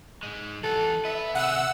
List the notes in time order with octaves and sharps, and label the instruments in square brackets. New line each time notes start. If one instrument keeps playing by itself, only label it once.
[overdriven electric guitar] G#2 G#3
[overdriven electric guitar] E3 F#5 [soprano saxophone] A4
[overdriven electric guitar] B3 B4 [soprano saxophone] E5
[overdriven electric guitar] C3 G#4 [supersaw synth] F#5 E6